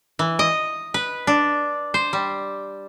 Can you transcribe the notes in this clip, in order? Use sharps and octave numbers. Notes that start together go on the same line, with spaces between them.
E3
D#5
B4
D4
C5
G3